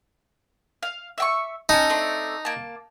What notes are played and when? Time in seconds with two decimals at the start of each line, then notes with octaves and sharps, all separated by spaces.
0.83 F5
1.18 E5 G5 C#6
1.69 C#4 D#4 A4
1.89 A3 C4 D4
2.45 A#3 A5